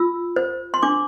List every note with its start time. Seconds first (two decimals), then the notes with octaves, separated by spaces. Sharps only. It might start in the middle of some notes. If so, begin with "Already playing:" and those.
Already playing: F4 E6
0.36 C5
0.74 C6
0.83 D4 D6